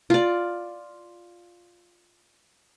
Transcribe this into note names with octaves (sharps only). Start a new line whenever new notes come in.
F4 D5